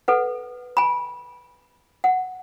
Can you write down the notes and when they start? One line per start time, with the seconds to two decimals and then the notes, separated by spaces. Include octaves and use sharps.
0.08 A4 B4 F#5
0.77 G#5 B5
2.04 F#5